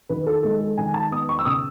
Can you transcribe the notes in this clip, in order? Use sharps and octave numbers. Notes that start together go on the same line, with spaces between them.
D#3 B4
A4
G#3 A4
A4
D#3 G#5
A5
B3 D#6
C#6
E6
C#3 D#6